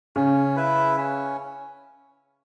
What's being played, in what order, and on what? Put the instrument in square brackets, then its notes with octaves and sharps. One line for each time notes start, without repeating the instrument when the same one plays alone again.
[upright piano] C#3 [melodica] C#4
[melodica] E4 B4 E5
C#4